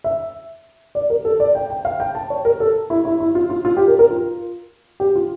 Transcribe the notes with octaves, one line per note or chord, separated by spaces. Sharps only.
E5
D5
A#4
A4
D5
G5
G5
F5
G5
A5
C#5
A#4
A4
E4
E4
E4
F4
F4
F4
G4
A#4
A#4
F4
G4
F4